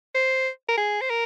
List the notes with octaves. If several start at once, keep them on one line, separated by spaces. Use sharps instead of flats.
C5
A#4
G#4
C5
A#4